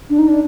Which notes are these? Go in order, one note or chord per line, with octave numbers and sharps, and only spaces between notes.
D4
D#4
D4